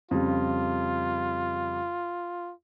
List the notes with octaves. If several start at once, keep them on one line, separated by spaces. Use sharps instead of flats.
F2 C#3 G3 F4